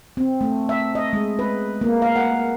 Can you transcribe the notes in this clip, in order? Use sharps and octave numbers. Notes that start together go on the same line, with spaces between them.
C4
A3
E5
D#5
G#3
B4
A#3
F5
F#5